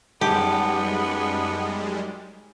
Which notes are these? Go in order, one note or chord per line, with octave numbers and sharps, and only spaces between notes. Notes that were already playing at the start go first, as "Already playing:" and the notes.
F#2 G3 G#3 B3 D#4 G4 A4